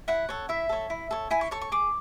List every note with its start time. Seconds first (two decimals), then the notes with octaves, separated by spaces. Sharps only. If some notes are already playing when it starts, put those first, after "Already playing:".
0.08 E4 F#5
0.29 A4 C#5
0.49 E4 E5
0.69 A4 C#5
0.90 E4
1.11 A4 C#5
1.31 E4 G#5
1.41 C#6
1.51 A4 C#5 C#6
1.62 C#6
1.72 G#4 D6